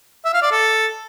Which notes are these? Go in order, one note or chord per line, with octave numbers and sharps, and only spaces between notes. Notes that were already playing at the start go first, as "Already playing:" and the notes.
E5
F5
D5
A4